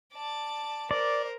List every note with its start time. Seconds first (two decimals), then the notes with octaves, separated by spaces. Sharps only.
0.13 D5 A5
0.91 A#4 C5 D5